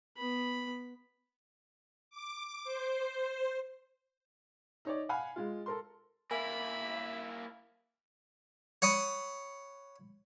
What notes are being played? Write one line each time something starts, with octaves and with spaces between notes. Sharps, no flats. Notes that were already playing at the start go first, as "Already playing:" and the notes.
B3 B5
D6
C5
D#4 C#5 D5
F5 F#5 G#5 B5
G#3 F4
A4 A#4 C6
A#3 E4 A#4 E5 G#5 B5
C#5 F#5 B5 D#6